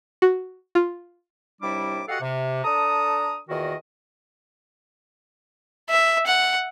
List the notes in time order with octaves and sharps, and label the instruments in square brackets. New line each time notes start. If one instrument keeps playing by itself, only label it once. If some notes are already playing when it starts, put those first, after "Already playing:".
[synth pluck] F#4
F4
[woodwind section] D#2 C3 G3 D4 E4 D6
F#4 G4 A4 D#5 F5 F#5
C3
D4 A4 A#5 D#6
E2 A#2 D#3 F#4 A#4 D#5
[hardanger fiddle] E5
F#5